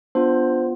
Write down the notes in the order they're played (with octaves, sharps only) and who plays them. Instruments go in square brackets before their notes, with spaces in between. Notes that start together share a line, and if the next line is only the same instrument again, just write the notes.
[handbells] B3 D4 F4 C5